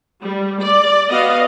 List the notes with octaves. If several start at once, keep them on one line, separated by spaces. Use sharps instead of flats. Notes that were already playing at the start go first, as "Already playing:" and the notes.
G3
D5
B3 F#4 D#5 F5